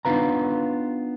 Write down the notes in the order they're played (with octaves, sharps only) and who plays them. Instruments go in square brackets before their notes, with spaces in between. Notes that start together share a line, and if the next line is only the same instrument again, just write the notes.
[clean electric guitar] B3 D4 D#4 F4 B4 A#5